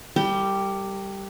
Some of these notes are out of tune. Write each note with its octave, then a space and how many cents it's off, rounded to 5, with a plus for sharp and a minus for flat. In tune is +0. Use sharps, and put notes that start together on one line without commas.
G3 +0 A#4 -45 G5 +0